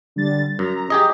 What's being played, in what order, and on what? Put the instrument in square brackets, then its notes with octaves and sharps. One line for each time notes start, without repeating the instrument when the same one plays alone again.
[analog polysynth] D3 G3 A6
[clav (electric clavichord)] F#2 [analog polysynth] A#5
[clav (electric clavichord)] G4 G#4 D#5